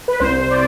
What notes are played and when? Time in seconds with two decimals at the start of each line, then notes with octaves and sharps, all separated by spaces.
0.08 B4
0.20 C2 C5
0.38 C5
0.51 D5